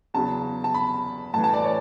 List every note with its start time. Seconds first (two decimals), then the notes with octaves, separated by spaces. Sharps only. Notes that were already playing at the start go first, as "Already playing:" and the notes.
0.14 E2 C#3 F#3 A5
0.64 A5
0.74 B5
1.33 A2 A5
1.38 E3
1.44 A5
1.54 D5
1.64 C#5